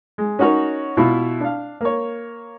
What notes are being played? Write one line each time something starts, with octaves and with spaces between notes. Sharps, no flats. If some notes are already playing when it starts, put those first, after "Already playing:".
G#3
C#4 D#4 F#4 A#4 C#5
B2 E4 F4
D4 F5
A#3 C#5